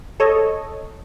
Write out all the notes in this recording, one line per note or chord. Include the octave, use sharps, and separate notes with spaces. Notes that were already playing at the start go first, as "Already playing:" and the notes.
A4 C#5 D#5